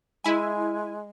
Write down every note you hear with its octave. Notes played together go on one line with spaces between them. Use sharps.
G#3 E4 G#5